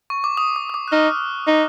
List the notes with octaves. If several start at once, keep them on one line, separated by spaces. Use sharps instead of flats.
C#6
D6
D#6
D6
D#6
D6
F#6
D#4 F6
D#4